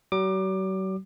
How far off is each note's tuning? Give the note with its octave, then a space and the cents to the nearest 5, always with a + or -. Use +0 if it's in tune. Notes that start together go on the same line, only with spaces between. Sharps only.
F#3 +45 D6 +25